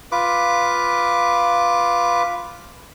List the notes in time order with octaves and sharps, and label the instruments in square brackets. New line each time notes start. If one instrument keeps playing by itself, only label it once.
[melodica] F4 B4 D6